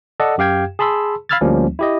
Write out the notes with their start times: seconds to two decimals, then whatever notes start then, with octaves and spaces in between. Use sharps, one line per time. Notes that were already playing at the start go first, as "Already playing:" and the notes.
0.20 A4 D5 D#5 F#5
0.38 F#2 G4 F5 G5 G#6
0.79 G#4 A5 B5 C6 E6
1.29 F5 B5 E6 F6 G#6 A6
1.41 D2 F3 G3 A#3 C#4
1.79 E4 G4 D#5